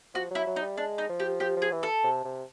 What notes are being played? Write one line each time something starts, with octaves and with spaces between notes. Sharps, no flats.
F3 F#4
F#3 E4
F#3
D#4
G3
G#3 D4
D#4
F3
G4
F3 G4
F3
G#4
E3
A4
C3
C3